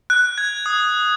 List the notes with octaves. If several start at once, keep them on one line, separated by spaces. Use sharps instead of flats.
F#6
G#6
D#6